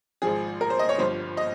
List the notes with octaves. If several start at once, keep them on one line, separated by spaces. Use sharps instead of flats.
G#1 G#2 F3 G#4
A#4
C5
D#5
C#5
G1 G2 F3 C5
D#5